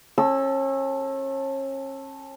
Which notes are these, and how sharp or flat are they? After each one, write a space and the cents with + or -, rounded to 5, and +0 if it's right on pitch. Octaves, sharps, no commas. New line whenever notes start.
C#4 -35 A4 +0 E6 +5